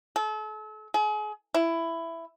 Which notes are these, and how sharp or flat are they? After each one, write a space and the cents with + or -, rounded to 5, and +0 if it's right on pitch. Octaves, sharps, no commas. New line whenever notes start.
A4 -40
G#4 +35
E4 +10